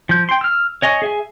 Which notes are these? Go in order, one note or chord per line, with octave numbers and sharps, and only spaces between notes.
F3 G6
G5 C6
E6 F6
C#5 D#5 G#5 C#6
G#4 E5 G#5